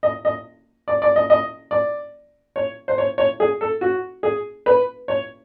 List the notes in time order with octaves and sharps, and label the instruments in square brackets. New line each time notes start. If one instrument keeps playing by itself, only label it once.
[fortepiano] D#5
D#5
D5
D5
D#5
D#5
D5
C#5
C5
C#5
C#5
G#4
A4
F#4
G#4
B4
C#5